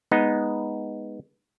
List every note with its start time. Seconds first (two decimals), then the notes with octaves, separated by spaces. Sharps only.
0.11 G#3 B3 D#4